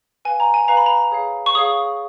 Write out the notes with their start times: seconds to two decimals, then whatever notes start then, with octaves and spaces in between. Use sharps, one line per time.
0.25 B4 F5 G#5
0.40 A#5
0.54 G#5
0.68 B4 F5 A#5
0.77 B5
0.86 A#5
1.12 G#4 C#5 F5
1.46 C#6
1.55 G#4 C#5 F5 D#6